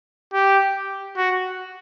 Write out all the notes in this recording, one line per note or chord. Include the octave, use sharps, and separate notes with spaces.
G4
F#4